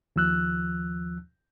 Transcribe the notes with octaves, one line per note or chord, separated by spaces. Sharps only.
D#2 F3 E6 F#6